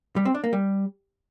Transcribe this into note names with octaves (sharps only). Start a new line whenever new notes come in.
G3
C4
D4
A#3
G3